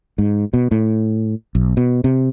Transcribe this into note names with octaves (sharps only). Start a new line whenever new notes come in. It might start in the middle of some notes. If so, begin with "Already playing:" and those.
G#2
B2
A2
B1
B2
C3